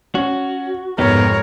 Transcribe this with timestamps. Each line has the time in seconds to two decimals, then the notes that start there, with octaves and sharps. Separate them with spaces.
0.15 C#4 F#4
0.98 F1 G#2 B3 D#4 G4 A#4 C#5